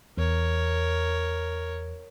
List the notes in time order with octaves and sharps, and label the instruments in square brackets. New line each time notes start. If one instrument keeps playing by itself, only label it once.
[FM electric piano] E2 [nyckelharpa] A#4 C#5